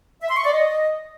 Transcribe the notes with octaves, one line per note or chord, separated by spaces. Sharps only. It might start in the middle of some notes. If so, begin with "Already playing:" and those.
E5
C6
C#6
D5
D#5